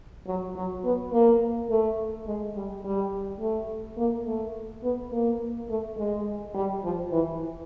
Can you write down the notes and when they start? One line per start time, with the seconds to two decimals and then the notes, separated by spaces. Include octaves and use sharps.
0.27 F#3
0.56 F#3
0.84 B3
1.12 A#3
1.70 A3
2.27 G#3
2.56 G3
2.84 G3
3.40 A3
3.98 A#3
4.27 A3
4.83 B3
5.12 A#3
5.70 A3
5.98 G#3
6.55 G3
6.84 F3
7.12 E3